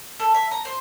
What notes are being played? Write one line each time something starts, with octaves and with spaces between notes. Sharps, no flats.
A4
E5
A#5
C5